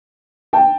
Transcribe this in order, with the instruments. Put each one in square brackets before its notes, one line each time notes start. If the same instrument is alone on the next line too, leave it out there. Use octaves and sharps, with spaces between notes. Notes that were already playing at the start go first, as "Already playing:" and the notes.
[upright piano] G5 A5